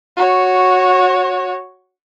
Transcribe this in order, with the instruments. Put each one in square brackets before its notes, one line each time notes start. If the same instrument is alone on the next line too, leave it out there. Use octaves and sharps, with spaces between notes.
[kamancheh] F#4 C#5